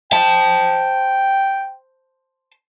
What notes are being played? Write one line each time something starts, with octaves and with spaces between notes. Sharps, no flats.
C5 G5 A5